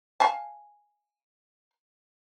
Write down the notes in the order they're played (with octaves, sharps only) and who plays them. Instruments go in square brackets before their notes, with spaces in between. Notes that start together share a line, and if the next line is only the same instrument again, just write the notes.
[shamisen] F5 G#5 A5